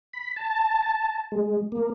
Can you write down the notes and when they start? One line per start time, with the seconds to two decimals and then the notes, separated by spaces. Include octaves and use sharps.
0.13 B5
0.36 A5
0.83 A5
1.32 G#3
1.72 A#3